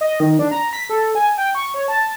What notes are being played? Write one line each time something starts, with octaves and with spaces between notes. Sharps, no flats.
D#5
D#3
D4
A#5
B6
A4
G#5
G5
C#6
C#5
A5